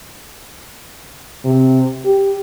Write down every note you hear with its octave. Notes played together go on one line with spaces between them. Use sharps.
C3
G4